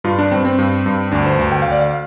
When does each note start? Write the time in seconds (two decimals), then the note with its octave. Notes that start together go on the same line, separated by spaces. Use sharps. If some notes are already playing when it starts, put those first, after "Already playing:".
0.04 G2 F4
0.19 D4
0.31 G2 C4
0.45 C4
0.58 G2
0.86 G2
1.12 D2 D4
1.26 C5
1.39 D2
1.52 G5
1.62 D2 F5
1.71 D5
1.81 F5